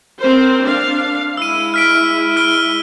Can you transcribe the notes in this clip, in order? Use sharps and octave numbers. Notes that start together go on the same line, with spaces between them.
C4 A#4 C5
D4 F5
G#3 E4 E6 D#7
F6 B6 D7
F6 D7 G7